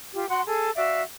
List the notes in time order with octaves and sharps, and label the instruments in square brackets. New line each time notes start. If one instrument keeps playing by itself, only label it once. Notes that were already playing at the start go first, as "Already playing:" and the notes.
[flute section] F4 G4
F#4 F#5 C6
G#4 A4
F#4 D5 E5 F5